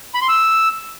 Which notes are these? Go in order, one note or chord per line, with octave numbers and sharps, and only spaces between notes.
B5
C6
E6